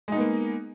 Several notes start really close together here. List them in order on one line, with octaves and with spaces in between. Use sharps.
G#3 D#4 B3 A#3